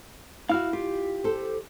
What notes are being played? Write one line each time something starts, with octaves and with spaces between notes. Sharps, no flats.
E4 F#4 F5 F6
F4 G4
A4 C5